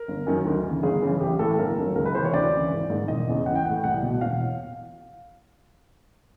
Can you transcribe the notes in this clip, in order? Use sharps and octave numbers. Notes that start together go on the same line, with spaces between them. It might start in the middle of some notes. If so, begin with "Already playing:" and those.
Already playing: A#4
G1
F#2 D#3
D2
C#3 E3
G1 G#4
F#2 C#3 E3
A1 G4
A2 E3 A4
A4
G1 A#4
F#2 D#3
C#2 A#4
B4
C3 E3 C5
C#5
D2 D5
C#3 E3
G#1
G#2 D#3
E1 D#5
E2 C#3 E3
A1 F#5
G5
A2 E3 F#5
C2 F#5
B2
E1 F5